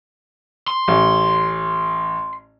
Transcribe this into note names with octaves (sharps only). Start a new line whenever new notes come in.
C6
A1